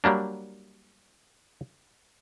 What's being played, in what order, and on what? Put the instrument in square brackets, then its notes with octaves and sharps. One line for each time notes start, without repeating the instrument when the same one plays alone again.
[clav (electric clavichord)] F#3 G3 A#3 D4